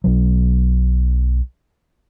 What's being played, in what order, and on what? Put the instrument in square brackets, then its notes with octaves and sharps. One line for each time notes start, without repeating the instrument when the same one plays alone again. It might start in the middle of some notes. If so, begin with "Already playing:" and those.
[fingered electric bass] B1 B2 F#3